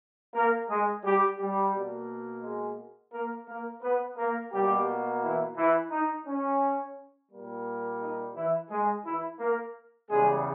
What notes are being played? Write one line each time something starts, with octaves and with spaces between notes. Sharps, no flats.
A#3 A#4
G#3 G#4
G3 G4
G3 G4
B2 A#3
G#3 G#4
A#3 A#4
A#3 A#4
B3 B4
A#3 A#4
B2 G3 A#3 G4
E3 E4
E3 E4
D#4
C#4
A#2 G3 A#3
D#4
E3 E4
G#3 G#4
E3 E4
A#3 A#4
E2 C#3 G3 G#3 G#4